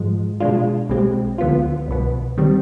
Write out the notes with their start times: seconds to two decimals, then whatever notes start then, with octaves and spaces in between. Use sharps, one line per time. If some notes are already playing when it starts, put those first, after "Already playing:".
Already playing: G#2 F3 G#3
0.40 B2 G#3 D4 F4
0.89 B1 B2 G#3 C4 G4
1.38 D2 D3 F3 B3 F4
1.88 C2 B2 B3
2.37 D#3 G3 C4